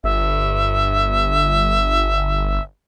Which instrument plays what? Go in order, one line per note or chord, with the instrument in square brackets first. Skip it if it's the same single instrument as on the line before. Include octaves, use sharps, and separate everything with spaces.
[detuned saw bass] G1 [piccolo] E5